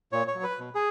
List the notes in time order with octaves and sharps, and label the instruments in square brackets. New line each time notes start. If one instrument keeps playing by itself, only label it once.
[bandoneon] A#2 C#5
C#5
F#3
B4
B2
G#4